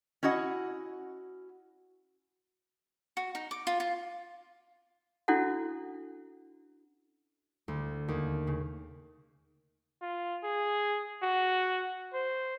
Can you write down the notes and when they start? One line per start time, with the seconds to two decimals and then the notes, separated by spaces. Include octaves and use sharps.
0.23 C#4 E4 F#4 D#5 F#5
3.17 F#4
3.35 D#4
3.51 D6
3.67 F4
3.80 F4
5.28 C#4 D4 E4 F#4 A4 F#5
7.68 D2
8.08 D#2
8.47 C#3
10.01 F4
10.43 G#4
11.23 F#4
12.14 C5